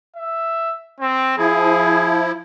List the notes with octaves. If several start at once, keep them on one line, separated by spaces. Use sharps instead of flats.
E5
C4
F3 E4 G#4